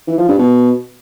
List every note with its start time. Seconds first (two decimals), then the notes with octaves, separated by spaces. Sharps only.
0.08 E3
0.18 F3
0.28 G2
0.39 B2